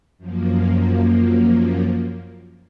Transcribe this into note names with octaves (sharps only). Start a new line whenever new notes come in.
F#2 F3 A#3